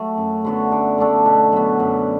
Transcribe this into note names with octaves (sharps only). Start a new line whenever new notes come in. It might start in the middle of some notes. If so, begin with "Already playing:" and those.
Already playing: F#3 A3
F#2
D3 F#3 B3
D3
A3 D4 A4
B2
F#3 B3
F#2